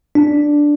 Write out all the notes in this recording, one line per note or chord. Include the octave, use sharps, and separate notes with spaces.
D4